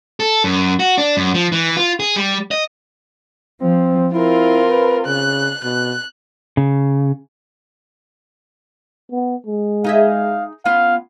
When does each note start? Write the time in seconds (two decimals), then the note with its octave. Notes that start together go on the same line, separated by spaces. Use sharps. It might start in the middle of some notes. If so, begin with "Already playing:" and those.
0.20 A4
0.44 F#2
0.79 F#4
0.98 D4
1.17 F#2
1.34 F3
1.52 E3
1.77 F4
2.00 G#4
2.16 G3
2.51 D#5
3.62 F3 C4
4.13 C4 E4 F4 A#4
4.70 B4
5.07 C#3 F#6
5.64 B2 F#6
6.57 C#3
9.12 B3
9.47 G#3
9.84 D#4 G#4 E5 F5
10.65 B3 C#4 F4 F5